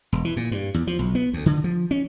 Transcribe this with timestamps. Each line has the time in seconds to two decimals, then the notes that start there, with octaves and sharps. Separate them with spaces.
0.13 E1
0.25 E3
0.37 A#2
0.51 G2
0.74 E2
0.87 F3
0.99 B1
1.15 B3
1.33 D2
1.46 D3
1.64 F3
1.91 C#4